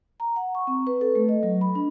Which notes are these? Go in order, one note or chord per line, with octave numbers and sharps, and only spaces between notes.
A#5
F#5
C#6
C4
B4
A4
A3
D#5
F#3
B5
D4